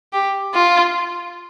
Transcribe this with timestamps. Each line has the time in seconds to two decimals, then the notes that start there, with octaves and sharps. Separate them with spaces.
0.13 G4
0.54 F4